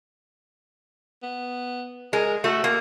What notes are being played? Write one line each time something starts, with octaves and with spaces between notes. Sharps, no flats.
B3
G#3 A#4
A3 F#4
A#3